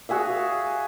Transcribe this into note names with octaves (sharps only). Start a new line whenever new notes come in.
F#4 G#4 E5 F5